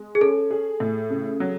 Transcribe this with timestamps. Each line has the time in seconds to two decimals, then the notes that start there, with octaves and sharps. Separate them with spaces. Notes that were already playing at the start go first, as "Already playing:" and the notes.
Already playing: G#3
0.15 G#4
0.21 C#4 A4
0.51 G#4
0.80 A2
1.10 C#3
1.40 F#3